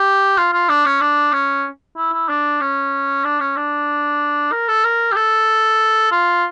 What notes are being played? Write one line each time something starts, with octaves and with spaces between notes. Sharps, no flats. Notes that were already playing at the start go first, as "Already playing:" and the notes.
Already playing: G4
F4
F4
D4
C#4
D4
C#4
E4
E4
D4
C#4
D4
C#4
D4
A#4
A4
A#4
G4
A4
F4